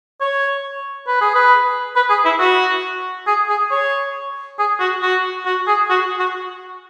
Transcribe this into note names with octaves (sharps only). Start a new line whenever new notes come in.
C#5
B4
G#4
B4
B4
G#4
E4
F#4
G#4
G#4
C#5
G#4
F#4
F#4
F#4
G#4
F#4
F#4